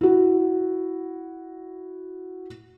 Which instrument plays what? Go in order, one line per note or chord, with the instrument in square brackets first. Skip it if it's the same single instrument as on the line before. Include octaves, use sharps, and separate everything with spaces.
[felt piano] E4 F#4